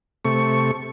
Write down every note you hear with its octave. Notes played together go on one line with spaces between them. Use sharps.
C3 A3 C#6